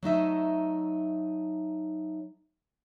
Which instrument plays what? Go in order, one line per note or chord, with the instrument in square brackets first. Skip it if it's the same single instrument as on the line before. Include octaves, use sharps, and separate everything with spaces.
[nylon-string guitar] F#3 A3 D#4 E5